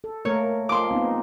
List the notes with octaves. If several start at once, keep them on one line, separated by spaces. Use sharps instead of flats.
A4
A3 A#3 A#4 C#5
A#2 F3 G#3 C6 D6
B3 C4 D#4